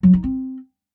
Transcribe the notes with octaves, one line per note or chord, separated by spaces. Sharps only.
F#3
D#4
C4